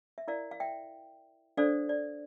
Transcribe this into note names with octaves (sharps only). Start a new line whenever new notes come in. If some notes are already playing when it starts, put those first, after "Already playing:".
E5
E4 A#4 D5 F5
F5
E5 G5
D4 A4 C5 D5 F5
D5